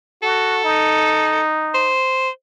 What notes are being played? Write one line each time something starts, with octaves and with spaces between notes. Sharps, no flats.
F#4 A4
D#4
C5